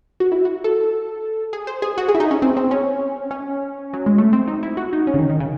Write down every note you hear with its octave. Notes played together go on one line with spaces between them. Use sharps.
F#4
E4
F#4
A4
G#4
C5
G#4
F#4
G#4
E4
D#4
C#4
C4
C4
C#4
C#4
F#3
G#3
A3
C4
D#4
E4
F#4
D#4
C#4
C#3
D#3
D#3
C#3